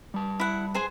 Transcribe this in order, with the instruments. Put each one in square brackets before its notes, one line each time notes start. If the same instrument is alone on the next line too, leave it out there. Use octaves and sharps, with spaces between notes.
[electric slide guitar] G3 A5
[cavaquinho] E4 F#5
G#4 C5 G#5